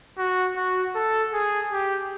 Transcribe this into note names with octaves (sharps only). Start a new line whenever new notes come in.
F#4
F#4
A4
G#4
G4